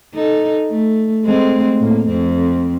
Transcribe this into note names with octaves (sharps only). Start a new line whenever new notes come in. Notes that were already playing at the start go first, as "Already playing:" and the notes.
D#4 A4
A3
G#3 A3 C4
A2 A#3
F2 C4